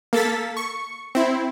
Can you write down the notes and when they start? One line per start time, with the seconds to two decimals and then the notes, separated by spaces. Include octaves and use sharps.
0.13 A#3 A4 A6 B6
0.57 C#6
1.15 C4 E4